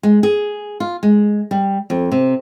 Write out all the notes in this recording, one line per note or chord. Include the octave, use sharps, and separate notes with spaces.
G#3
G#4
F4
G#3
G3
F2
C3